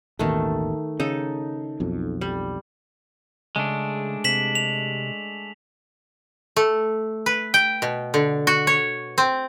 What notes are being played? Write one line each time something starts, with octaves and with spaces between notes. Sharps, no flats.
A1 D#2 B2 D#3 A3
C#3 D#4 A4
B1 F2
G3
C#3 G#3 A3 D4
C3 B6 E7 F#7
F7
A3
B4
G5
B2
D3
F#4
C#5
C4